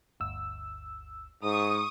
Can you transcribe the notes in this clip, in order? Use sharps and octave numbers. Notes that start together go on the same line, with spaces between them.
G1 D2 E6
G#2 C#6 D#6